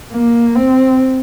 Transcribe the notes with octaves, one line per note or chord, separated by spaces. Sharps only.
A#3
C4